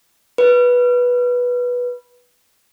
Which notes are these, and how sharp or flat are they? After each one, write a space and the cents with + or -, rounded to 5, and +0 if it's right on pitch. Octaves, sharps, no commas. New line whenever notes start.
B4 -10